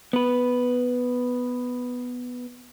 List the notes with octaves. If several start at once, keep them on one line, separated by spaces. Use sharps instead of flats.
B3 B4